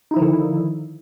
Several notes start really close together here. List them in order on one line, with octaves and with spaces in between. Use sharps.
D#4 E4 F3 D#3 D3